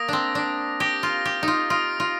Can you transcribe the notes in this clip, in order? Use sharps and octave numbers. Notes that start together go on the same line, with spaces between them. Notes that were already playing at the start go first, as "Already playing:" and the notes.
Already playing: A#3 D#6 A#6 D7
C4 D4
D4
G4 D#6 A#6 D7
F4
G4
D#4 F4
F4 D#6 A#6 D7
F4